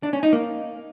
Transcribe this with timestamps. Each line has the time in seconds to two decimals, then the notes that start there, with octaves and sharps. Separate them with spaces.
0.03 D4
0.13 C#4
0.23 D#4
0.33 A#3